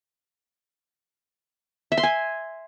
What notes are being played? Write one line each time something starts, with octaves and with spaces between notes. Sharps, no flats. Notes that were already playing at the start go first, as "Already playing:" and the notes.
E5
C6
G#5